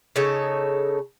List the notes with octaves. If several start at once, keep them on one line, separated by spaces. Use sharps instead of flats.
C#3 D#4 A4 C#5